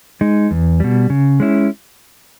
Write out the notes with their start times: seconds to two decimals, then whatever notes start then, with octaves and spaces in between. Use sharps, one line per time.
0.21 G#3 D#4
0.51 E2
0.80 B2 G3
1.10 C#3
1.40 G#3 C#4 E4